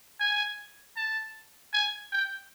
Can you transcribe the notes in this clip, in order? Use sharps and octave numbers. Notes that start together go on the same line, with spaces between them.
G#5
A5
G#5
G5